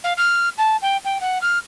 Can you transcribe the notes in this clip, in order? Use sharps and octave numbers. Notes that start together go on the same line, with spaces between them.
F5
F6
A5
G5
G5
F#5
F6